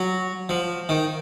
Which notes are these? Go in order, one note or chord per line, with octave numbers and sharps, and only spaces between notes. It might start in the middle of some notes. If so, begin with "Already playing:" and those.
Already playing: F#3
F3
D#3